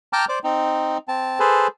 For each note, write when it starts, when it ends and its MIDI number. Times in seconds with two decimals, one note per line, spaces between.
0.13 0.25 79
0.13 0.25 81
0.13 0.25 82
0.13 0.25 86
0.13 0.25 89
0.29 0.39 72
0.29 0.39 74
0.29 0.39 86
0.44 0.98 60
0.44 0.98 63
1.08 1.39 60
1.08 1.39 81
1.40 1.67 68
1.40 1.67 69
1.40 1.67 71
1.40 1.67 72